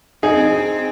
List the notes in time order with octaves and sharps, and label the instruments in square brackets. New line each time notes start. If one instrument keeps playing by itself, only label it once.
[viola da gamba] C4 [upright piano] D#4 G#4